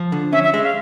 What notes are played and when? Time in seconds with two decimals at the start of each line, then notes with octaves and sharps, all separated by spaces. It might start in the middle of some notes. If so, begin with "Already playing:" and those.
Already playing: F3
0.12 D3
0.32 C#4 E5
0.43 E5
0.54 G#3 E5
0.64 F5